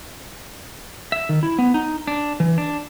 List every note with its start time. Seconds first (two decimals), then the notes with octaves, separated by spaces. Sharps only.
1.12 E5
1.29 D#3
1.43 E4
1.59 B3
1.74 D#4
2.07 D4
2.40 E3
2.58 D4